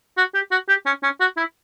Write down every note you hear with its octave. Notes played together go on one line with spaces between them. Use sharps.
F#4
G4
F#4
G4
C#4
C#4
F#4
E4